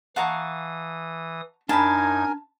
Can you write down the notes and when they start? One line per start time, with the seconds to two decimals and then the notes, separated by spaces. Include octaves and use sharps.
0.16 E3 F5 F#5 A5 A#5 C#6 D#6
1.69 F#2 D4 D#4 A#4 G#5 A5 B5 G#6